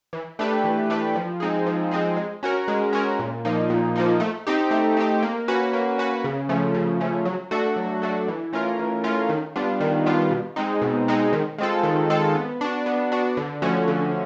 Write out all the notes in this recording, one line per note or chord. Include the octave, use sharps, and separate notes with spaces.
E3
A3 D4 G4 B4
E3
A3 D4 G4 B4
F3
G#3 C4 D#4 G#4
F3
G#3 C4 D#4 G#4
G#3
C#4 F#4 A#4
G#3
C#4 F#4 A#4
A#2
F3 A#3 D#4
A#2
F3 A#3 D#4
A3
C4 D#4 G4
A3
C4 D#4 G4
A#3
C#4 F#4 B4
A#3
C#4 F#4 B4
C#3
F3 A3 C#4
C#3
F3 A3 C#4
F#3
A3 D4 F#4 A4
F#3
A3 D4 F#4 A4
E3
A3 C#4 F4 A#4
E3
A3 C#4 F4 A#4
D#3
G3 B3 D4 F4
D#3
G3 B3 D4 F4
B2
G#3 C4 D#4
B2
G#3 C4 D#4
D#3
G#3 C4 F4 A4
D#3
G#3 C4 F4 A4
B3
D4 F#4
B3
D4 F#4
D3
F3 A3 C#4 F#4
D3